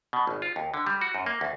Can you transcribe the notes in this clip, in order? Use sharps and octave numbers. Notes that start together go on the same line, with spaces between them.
B2
G#1
F4
D#2
D3
G3
F#4
F#2
A#3
D2